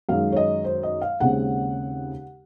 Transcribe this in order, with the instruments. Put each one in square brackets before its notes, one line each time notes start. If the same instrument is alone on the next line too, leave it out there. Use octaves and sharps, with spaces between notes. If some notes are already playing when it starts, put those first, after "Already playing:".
[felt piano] F#2 D#3 G#3 F5
C#5
D#5
C5
D#5
F5
D#2 C#3 G#3 C4 F#5